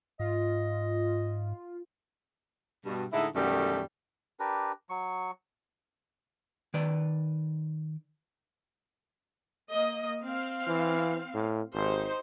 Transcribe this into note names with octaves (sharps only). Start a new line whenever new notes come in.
G#2 F4 D#5
G2 B2
A2 D3 G#3 D#4 E4
F#2 B2 D3 D#3 G3 A3
D4 G4 A#4 B4
F#3 C#6
D#3 B4 D5
A#3 D#5
C4 F5
E3
A2
G#1 D#4 G4 C5